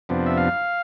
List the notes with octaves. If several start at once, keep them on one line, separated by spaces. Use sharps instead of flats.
F2 C3 F3 B3 D4
E5
F5